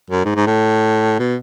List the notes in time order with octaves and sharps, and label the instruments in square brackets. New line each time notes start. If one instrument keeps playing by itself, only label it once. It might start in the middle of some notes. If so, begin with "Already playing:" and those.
[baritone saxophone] F#2
G#2
G#2
A2
B2